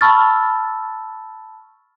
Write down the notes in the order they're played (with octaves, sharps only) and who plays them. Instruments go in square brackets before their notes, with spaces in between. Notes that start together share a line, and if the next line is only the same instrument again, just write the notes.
[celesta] A5 B5 C#6 E6 F6 A6